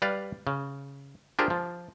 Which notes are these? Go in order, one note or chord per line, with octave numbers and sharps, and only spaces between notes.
G3 B4 D5 F5
C#3
D4 F4 G4 G#4 A#4 C5
F3